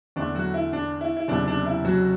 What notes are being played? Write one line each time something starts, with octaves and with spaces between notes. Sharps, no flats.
E2 D3 A3 D4
F#3 F#4
E4
D4
E4
E4
F#1 E2 C3 D4
D4
E4
F#3 F#4